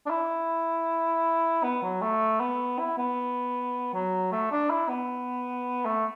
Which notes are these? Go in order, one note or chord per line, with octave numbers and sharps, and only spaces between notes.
D4
E4
B3
F#3
A3
B3
E4
B3
F#3
A3
D4
E4
B3
A3